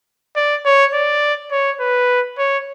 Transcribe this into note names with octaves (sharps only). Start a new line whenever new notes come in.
D5
C#5
D5
C#5
B4
C#5